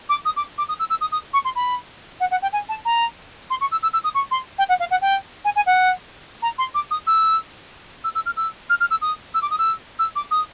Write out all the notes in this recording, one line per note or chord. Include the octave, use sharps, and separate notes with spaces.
D6
D#6
D6
D6
D#6
E6
E6
D#6
D#6
C#6
C6
B5
F#5
F#5
G5
G#5
A5
A#5
C6
C#6
E6
E6
E6
D#6
C#6
C6
G5
F#5
F5
F#5
G5
G#5
G#5
F#5
A#5
C6
D6
D#6
E6
E6
E6
F6
E6
F6
F6
E6
D#6
E6
D6
D#6
E6
E6
D6
D#6